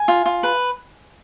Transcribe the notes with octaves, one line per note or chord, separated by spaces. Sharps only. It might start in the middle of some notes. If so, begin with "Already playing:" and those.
Already playing: G#5
F4
F4
B4